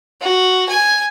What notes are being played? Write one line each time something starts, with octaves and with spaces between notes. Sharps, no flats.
F#4
G#5